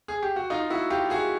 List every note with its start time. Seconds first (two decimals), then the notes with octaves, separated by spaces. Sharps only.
0.08 G#4
0.22 G4
0.36 F#4
0.50 D#4 F4
0.70 E4 F#4
0.90 F4 G4
1.10 F#4 G#4